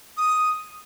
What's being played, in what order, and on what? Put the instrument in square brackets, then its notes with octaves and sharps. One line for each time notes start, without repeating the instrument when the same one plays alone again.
[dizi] D#6